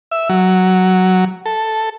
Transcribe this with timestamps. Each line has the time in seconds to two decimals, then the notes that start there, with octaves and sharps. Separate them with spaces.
0.11 E5
0.29 F#3
1.46 A4